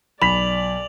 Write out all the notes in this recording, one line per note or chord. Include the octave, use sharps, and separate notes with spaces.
B1 D5 B5 B6 F7 F#7